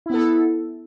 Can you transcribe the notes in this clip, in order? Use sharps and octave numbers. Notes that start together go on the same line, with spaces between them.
B3 E4 A4